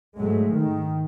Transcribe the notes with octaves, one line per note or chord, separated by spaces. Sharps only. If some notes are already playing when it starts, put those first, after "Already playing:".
G#2 F#3 G#3 A3
D#3